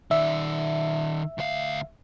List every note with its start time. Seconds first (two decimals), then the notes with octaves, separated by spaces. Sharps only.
0.11 D#3 D5 E5
1.38 D2 F5